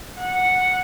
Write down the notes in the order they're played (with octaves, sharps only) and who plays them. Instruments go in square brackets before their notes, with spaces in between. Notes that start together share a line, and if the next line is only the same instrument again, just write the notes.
[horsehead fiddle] F#5